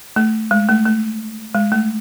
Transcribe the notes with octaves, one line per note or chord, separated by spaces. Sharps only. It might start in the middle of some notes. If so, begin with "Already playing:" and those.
A3
G#3
A3
A3
G#3
A3